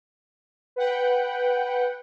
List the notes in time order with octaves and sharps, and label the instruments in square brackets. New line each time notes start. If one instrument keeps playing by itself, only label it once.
[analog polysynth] B4 F#5 G5